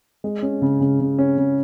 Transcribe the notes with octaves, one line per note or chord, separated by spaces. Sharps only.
G#3
C#4
C#3
C#3
C#3
C#4
C#3